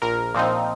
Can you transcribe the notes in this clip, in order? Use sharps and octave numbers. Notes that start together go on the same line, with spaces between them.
A#1 A#4
A#2 F3 C4 D#4